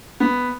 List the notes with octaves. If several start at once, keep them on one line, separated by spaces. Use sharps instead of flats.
B3